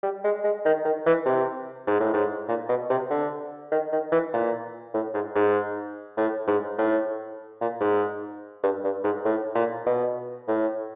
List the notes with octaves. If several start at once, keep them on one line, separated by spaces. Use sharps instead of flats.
G3
G#3
G#3
D#3
D#3
E3
C3
G#2
A2
G#2
A#2
B2
C3
D3
D#3
D#3
E3
A#2
A2
G#2
G#2
A2
G#2
A2
A#2
G#2
G2
G2
G#2
A2
A#2
B2
A2